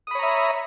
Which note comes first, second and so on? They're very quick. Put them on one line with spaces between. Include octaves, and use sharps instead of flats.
D#6 B5 C#5 A#5 E5